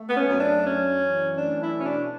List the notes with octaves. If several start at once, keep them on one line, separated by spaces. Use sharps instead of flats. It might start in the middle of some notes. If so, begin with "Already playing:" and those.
Already playing: A3
B3
C#4
F#2
D4
F#2 C#4
E3
A3 D4
E4
B2 C#4
D4